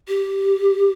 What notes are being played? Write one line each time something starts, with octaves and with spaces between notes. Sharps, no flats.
G4